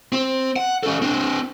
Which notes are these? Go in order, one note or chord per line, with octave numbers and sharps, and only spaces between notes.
C4
F#5
C#4 A4
C4 D4